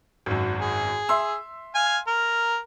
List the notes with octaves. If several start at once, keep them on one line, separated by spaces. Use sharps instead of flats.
G#1 F#2
G#4
E5 C6 E6
F5 G#5
A#4